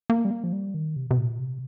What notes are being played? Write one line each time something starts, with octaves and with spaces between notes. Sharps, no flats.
A#3
G3
A#3
F3
G3
D#3
C3
C3
A#2
C3